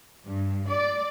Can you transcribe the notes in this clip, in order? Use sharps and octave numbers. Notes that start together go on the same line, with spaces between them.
G2
D5